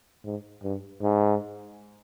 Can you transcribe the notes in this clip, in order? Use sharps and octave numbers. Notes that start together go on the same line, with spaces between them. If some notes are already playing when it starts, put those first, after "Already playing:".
G#2
G2
G#2